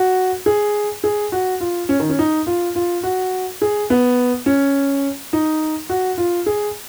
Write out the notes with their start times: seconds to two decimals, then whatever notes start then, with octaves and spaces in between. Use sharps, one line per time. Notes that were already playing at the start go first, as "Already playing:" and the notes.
Already playing: F#4
0.46 G#4
1.04 G#4
1.32 F#4
1.60 F4
1.89 C#4
2.00 D#3
2.09 C#4
2.19 D#4
2.47 F4
2.76 F4
3.03 F#4
3.62 G#4
3.90 B3
4.46 C#4
5.33 D#4
5.89 F#4
6.18 F4
6.46 G#4